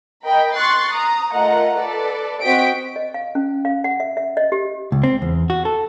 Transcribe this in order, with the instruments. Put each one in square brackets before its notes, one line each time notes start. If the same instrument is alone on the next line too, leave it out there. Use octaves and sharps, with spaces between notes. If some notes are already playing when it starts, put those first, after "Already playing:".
[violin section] A#4 D#5 G5 B5
C6 C#6 F#6 A6 C7
A#5 D#6
A3 F4 A#4 D#5 F#5 A#5
A4 B4 D5
C4 F#4 D#5 G5 B6 D7
[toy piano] D#5
F5
C#4
F5
F#5
E5
E5
D#5
G4
[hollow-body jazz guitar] C#2
C4
E2
F#4
A4